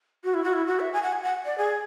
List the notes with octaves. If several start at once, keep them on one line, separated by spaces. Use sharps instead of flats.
F#4
E4
F#4
E4
F#4
E5
G#5
F#5
G#5
F#5
D5
G#4